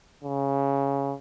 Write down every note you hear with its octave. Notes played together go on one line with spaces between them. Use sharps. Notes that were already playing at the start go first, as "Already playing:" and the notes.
C#3